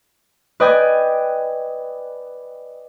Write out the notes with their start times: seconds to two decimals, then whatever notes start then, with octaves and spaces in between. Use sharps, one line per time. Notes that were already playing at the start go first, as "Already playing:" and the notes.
0.60 B4 D5 D#5 G5 G#5 D6